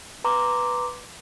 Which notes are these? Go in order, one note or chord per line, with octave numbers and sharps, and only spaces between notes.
B4 A#5 C6 D6